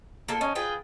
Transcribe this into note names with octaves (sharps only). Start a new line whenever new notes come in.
A#3 F4 A4
C#4 D#4
F4 G#4 B4 G5